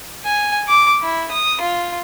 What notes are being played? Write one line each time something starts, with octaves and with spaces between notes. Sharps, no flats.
G#5
D6
E4
D#6
F4